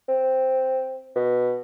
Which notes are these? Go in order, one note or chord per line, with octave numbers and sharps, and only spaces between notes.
C4
B2